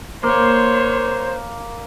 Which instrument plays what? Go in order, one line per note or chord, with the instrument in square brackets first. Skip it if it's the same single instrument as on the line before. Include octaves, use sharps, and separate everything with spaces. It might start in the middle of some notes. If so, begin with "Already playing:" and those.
[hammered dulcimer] A#3 [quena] C5 [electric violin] C#5 C6